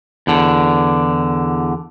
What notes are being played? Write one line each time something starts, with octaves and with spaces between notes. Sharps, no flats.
E2 D3